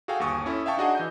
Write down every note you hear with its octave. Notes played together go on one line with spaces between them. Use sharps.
F#4 G#4 A4 F5 G5 G#5
G1 D#2 G#5 C#6 D#6
C#4 E4 A4
E5 F5 G5 A5 C#6
D4 D#4 F#4 G#4 D#5 F#5
E3 D#5 G6